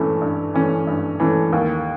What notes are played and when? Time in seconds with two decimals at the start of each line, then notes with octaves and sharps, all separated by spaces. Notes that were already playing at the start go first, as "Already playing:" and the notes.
Already playing: G2 E3 A3 C#4
0.21 G2
0.54 E3 A3 C#4
0.87 G2
1.20 E3 A3 C#4
1.53 D#2